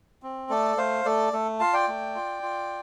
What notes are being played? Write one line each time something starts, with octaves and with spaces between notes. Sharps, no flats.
C4
A3 A4 D5
A3 C5 F5
A3 A4 D5
A3 A4
F4 F5 A5
D5 G5
A3
F4
F4